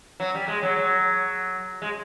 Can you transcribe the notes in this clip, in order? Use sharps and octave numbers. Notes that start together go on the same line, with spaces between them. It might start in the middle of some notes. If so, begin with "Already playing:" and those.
F#3
G3
G#3
F#3
F#3
G#3